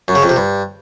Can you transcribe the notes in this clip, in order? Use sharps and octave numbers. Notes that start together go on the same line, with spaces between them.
F#2
C#3
F2
C3
G2